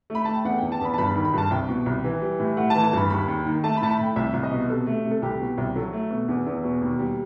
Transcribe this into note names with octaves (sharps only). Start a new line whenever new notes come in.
A3 B5
A3 A5
G5
E2 F#5
E2 G5
A5
E2 B5
A5
G2 B5
B5
D#3
B5
G2 A5
C2 G5
B2
C2
E3
G3
A2
A3 F#5
A5
E3
A5
G2 B5
D#2 B5
D#2
D#3
A3 A5
B5
A2 A5
B5
A2 G5
C2 E5
C2
D#5
B2
C3 A4
A3
C3
A4
C2 G4
B2
C2
F#3 A4
A3
B2
E2
E2
B2
D#2
G3